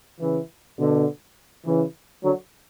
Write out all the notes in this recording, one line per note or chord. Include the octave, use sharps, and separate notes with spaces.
C#3 E3
B2 D3
C#3 E3
D3 F#3